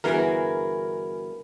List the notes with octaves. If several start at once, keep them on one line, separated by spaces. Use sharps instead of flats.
G1 E3 F#4 G#4 A#4 B4